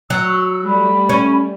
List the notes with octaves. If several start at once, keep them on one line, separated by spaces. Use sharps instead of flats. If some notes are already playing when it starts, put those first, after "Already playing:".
F#3 E6
G3 A3 B5
C#4